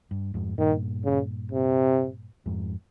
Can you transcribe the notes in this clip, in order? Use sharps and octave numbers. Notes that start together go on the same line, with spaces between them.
G2
F2 G#2
G2 A#2 D#3
C#3
C3
F2 G#2